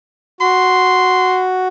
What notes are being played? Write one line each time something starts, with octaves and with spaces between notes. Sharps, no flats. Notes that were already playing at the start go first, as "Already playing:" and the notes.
F#4 C6